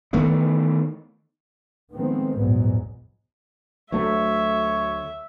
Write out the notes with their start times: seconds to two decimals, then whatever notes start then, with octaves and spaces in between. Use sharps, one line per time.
0.13 D#3 E3 A3 B3
1.92 D#3 F3 G#3 A3 B3 C4
2.34 A#1 E2 G#2 F#3 G#3 B3
3.92 D2 F#3 A3 C#5 E5